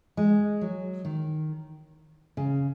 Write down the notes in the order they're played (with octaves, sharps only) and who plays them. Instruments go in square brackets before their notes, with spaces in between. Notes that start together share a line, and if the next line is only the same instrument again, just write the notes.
[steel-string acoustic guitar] G#3
F#3
D#3
C#3